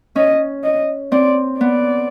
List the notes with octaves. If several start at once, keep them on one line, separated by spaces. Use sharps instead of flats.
C#4 D#5
D#5
C4 D5
B3 D5